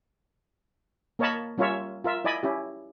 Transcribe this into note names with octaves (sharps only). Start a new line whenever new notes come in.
A#3 A#4 C#5 D#5 A5 B5
G3 C#4 F4 A#4 C#5 E5
F4 A#4 E5
E4 D5 D#5 G#5 B5
C#4 E4 G4